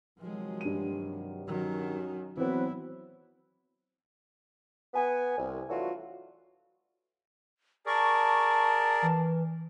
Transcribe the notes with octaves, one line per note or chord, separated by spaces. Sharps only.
C3 D#3 F3 F#3 G#3
G2 D#7
D#3 F#3 C#4 F#4
E3 F#3 B3 C4 E4 B4
B3 G#5
C2
E3 F#3 A3 D4 F4 F#4
G#4 A#4 D5 A5 C#6
E3